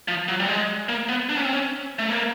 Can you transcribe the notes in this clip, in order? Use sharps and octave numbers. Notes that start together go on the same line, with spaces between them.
F3
F#3
G3
G#3
A#3
B3
D4
C#4
C4
C#4
A3
A#3